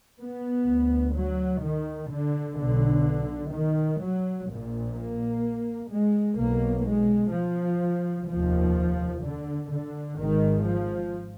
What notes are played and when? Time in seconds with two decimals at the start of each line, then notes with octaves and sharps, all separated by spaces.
0.20 B3
0.67 D2
1.15 F#3
1.63 D#3
2.10 D3
2.57 B1 B2 D3
3.53 D#3
4.00 F#3
4.48 A#1 A#2
4.95 A#3
5.91 G#3
6.38 B1 B2 A#3
6.86 G#3
7.33 F3
8.28 F1 D#2 F3
9.24 D3
9.71 D3
10.19 G#1 G#2 D#3
10.66 F3